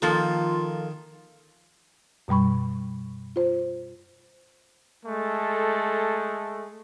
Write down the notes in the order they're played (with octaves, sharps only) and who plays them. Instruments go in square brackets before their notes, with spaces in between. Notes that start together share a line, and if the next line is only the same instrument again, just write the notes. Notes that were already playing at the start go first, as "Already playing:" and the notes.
[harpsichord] D#3 [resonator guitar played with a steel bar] F3 A#3 A4 [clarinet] F4
[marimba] F#2 B2 G3 B5 C#6
F4 C5
[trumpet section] G#3 A3 A4